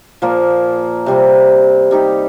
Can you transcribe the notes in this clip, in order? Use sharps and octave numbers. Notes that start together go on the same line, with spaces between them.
A#2 F3 A#3
C3 G3 C4
G3 D#4 G4